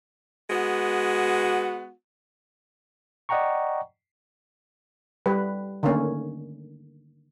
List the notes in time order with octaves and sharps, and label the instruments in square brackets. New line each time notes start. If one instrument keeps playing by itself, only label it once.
[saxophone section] G#3 B3 F#4
[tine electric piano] D5 D#5 F#5 G5 A#5 C#6
[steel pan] G3 B4
D3 D#3 A3 A#3 C#4